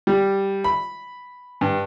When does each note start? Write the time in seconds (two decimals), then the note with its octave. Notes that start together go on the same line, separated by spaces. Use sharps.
0.07 G3
0.64 B5
1.61 G2